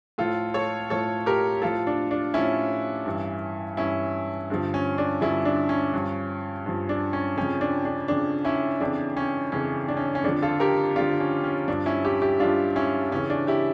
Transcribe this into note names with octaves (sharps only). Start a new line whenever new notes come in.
A2 F3 F4 A4
A4 C#5
A2 F3 A4 C#5
G4 A#4
A2 F3 F4 A4
D4
D4
A2 F3 C#4 E4
G2 E3
G2 E3 C#4 E4
G2 D3 F3
C#4
D4
G2 D3 F3 C#4 E4
D4
C#4
G2 F3
G2 F3
D4
C#4
F2 C#3 F3 C#4
D4
D4
F2 C#3 F3 D4
C#4 E4
F2 C#3 E3 D4
C#4
F2 C#3 E3 C#4
D4
C#4
C#4
F2 D3 F3 D4
F4 A4
G4 A#4
F2 D3 F3 D4 F4
C#4
C#4
G2 F3 D4
C#4 E4
E4 G4
E4 G4
G2 F3 D4 F4
C#4 E4
F2 C#3 E3 C#4
D4
E4 G4